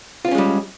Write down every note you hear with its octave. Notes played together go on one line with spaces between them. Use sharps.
G3 G#3 C4 C#4 F4